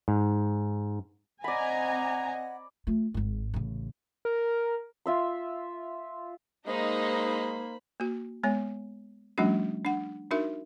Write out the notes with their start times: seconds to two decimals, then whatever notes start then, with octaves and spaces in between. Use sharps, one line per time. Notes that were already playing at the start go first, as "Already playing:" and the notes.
0.08 G#2
1.44 C4 D5 D#5 F#5 G#5 A#5 B5
2.87 A3 F4
3.14 G#1 G#2
3.54 A1 C#3
4.25 A#4
5.06 F4 E5 C6
6.67 G#3 A#3 D#4 C5 B5
8.00 A#3 F#4
8.43 G#3 B3 C#5
9.38 F3 G3 A3 C#4 D4 F#4
9.85 D4 F#5
10.31 D4 D#4 F#4 A#4 E5